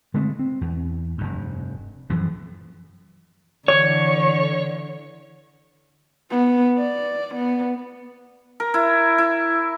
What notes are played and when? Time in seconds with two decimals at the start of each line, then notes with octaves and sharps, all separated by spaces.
0.14 D3 G#3 A3 C4
0.39 C4
0.61 E2
1.18 F1 G2
2.10 F#2 E3 F3
3.68 D3 E3 C#5
6.30 B3
6.78 D5
7.35 B3
8.60 A#4
8.74 E4
9.18 E4